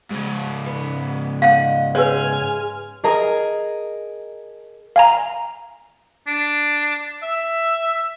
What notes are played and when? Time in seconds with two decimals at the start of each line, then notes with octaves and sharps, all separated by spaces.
0.11 G#2 C#3
0.66 B3
1.42 D#5 F5 F#5
1.95 G#3 B4 C#5 G#5 F6
3.04 G#4 A#4 D#5 G#5 A#5 D#6
4.96 F5 G#5 A#5
6.27 D4
7.23 E5